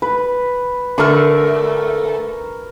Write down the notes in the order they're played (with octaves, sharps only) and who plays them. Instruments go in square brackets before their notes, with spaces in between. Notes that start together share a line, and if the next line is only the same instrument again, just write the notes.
[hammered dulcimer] B4
[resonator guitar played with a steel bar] D3 A3 [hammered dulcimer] A#4 C#6